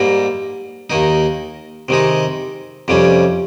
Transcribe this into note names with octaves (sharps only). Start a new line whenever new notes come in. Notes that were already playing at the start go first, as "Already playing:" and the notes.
Already playing: G#2 G3 A#3
D#2 D#3 A#3 D#4
C3 D#3 G#3 D#4
F2 C3 G3 C#4